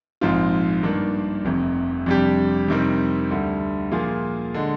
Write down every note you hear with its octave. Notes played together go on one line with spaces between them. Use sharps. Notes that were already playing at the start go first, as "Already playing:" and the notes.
A#1 G#2 F3 C4 F4
G2 D#3 A#3 D4
F1 F2 C3
F2 C3 G3 D4 G4
F2 C3 D#3 G3 C4
D2 D3 G3
A#2 F3 A#3 F4 G#4
D3 G#3